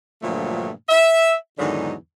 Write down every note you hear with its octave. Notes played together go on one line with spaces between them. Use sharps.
G2 A#2 D3 F3 F#3 A3
E5
E2 G#2 D3 D#3 F#3 D#4